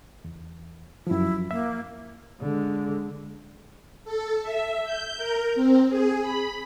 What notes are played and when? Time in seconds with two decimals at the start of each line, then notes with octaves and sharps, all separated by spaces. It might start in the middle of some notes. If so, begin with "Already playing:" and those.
0.25 E2
1.07 F#2 F3 E4
1.51 A#3 E5
2.40 D3 G#3
4.04 A4
4.42 E5
4.83 G6
5.17 A#4
5.55 C4
5.89 G#4
6.21 B5